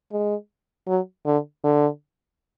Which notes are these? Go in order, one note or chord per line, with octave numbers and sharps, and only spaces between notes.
G#3
F#3
D3
D3